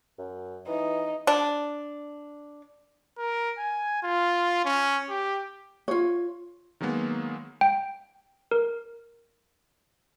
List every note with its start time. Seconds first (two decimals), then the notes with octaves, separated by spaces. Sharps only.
0.18 F#2
0.67 E3 D#4
1.27 D4
3.18 A#4
3.58 G#5
4.03 F4
4.65 C#4
5.10 G4
5.88 F4 C#5
6.81 D#3 F#3 G#3 A#3 B3
7.61 G5
8.52 A#4